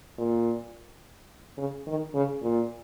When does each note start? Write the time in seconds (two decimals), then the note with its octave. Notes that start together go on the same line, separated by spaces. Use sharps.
0.18 A#2
1.58 C#3
1.87 D#3
2.15 C#3
2.42 A#2